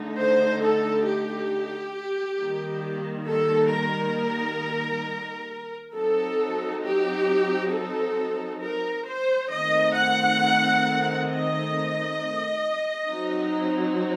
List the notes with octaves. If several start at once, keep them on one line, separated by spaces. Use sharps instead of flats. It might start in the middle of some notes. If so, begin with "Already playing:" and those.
Already playing: D3 A3 D#4
C5
A4
G4
D#3 G3 A#3
A4
A#4
F#3 C4 D#4 A4
G4
A4
A#4
C5
D#3 A3 C4 D#5
F#5
D#5
F#3 C4 D#4